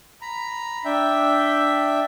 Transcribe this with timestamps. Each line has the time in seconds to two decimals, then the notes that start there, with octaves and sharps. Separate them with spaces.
0.22 A#5 B5
0.85 D4 E5 G5